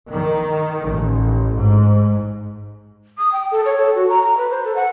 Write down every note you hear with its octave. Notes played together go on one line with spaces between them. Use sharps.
D#3
A1
G#2
D#6
G5
A4
C#5
A4
F#4
A#5
A#5
B4
C5
A4
F#5